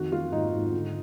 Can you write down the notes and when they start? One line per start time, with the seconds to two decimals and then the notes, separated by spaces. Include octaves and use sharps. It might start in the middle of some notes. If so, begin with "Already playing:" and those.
Already playing: F2 D#3 F#4
0.12 D#3 F4
0.32 G#2 D#4
0.53 G#2
0.73 D3